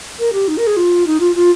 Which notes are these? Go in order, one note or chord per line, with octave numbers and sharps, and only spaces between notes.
A#4
G4
D#4
A#4
G#4
F4
D#4
F4
F4